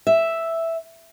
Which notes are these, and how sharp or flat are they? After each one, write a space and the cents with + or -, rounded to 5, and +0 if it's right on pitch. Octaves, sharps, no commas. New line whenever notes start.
E5 +0